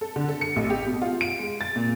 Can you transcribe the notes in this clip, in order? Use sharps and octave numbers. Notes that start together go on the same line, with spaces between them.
A4
D3
A4
C#7
A1
G4
B2
F4
D7
G#3
A6
A#2